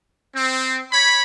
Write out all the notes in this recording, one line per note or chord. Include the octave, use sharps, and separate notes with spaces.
C4
C#5 B5